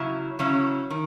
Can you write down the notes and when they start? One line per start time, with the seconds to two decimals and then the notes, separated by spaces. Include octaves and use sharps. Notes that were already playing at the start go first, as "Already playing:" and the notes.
Already playing: C#3 F#3 C#4 E4
0.39 C#3 F#3 C#4 E4
0.90 D#3